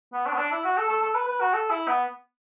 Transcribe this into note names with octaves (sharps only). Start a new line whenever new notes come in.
B3
D4
B3
D4
E4
F#4
A4
A4
A4
B4
B4
F#4
A4
E4
B3